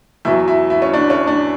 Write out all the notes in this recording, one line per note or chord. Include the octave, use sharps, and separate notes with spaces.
E2 B2 F#3 E4
E4
E4
C#4
D4
C#4
D4